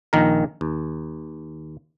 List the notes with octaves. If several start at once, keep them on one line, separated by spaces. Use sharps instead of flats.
A#1 D#3 A#4
D#2